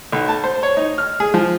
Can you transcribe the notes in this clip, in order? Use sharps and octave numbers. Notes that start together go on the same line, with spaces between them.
B1
A5
C5
C#5
D#4
F6
G#4
F3